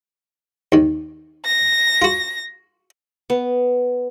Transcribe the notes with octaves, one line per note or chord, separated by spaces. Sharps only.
D#2 D#3
A#6
F4 F#4
B3